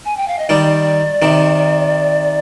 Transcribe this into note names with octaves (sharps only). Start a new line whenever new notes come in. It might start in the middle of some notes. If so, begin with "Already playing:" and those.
G#5
G5
F5
D#5
D#3 G3 D5
C3 D#3